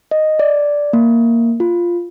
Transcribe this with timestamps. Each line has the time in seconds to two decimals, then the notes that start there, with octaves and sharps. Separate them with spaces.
0.11 D#5
0.39 D5
0.93 A#3
1.60 F4